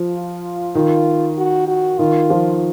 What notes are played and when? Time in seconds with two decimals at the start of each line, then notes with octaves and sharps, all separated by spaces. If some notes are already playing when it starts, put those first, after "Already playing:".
Already playing: F3
0.14 F4
0.75 D#3 F4
1.38 F#4
1.67 F#4
1.99 D#3 F4
2.30 F3